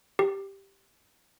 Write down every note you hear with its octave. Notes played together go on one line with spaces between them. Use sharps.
G4